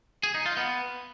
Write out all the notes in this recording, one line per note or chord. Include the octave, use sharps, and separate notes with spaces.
G#4
D#4
F4
B3